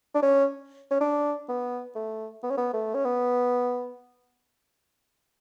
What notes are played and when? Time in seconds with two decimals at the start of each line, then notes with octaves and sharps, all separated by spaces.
0.14 D4
0.22 C#4
0.91 C#4
1.01 D4
1.49 B3
1.95 A3
2.43 B3
2.50 C#4
2.57 B3
2.73 A3
2.94 C#4
3.05 B3